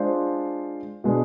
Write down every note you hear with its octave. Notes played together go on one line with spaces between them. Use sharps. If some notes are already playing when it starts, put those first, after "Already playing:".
Already playing: G#3 D4 F4 C5
B2 G#3 D4 G#4